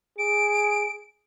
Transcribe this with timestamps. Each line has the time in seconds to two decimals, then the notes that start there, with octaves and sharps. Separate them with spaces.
0.18 G#4 D7